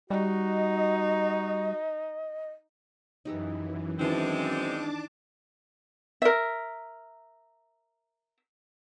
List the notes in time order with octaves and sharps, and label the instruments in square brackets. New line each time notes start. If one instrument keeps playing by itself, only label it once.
[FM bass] G3 [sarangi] D#4 [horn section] F#4 [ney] D#5
[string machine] F#2 E3 [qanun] D#4 G4 A4
[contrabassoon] F#2 [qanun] D#3 E3 [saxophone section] G#3 C4 [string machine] D4 A5 D6
[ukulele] A#4 E5